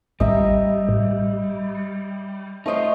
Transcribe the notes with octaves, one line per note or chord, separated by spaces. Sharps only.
A1 G3 D#5 E5 A#5
A1
A3 D#4 F4 C5 C#5 D#5